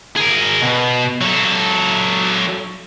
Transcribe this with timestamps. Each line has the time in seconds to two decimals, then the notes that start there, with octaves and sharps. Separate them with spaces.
0.17 G#4 A#4
0.62 B2
1.21 F#3 A4